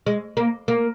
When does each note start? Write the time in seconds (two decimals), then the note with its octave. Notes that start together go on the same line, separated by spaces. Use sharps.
0.06 G#3
0.37 A#3
0.68 A#3